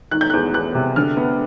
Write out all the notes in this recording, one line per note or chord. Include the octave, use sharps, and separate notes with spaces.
D#3 F#6
G6
E2 F#6
E2 F#6
C3
D3 F6
B3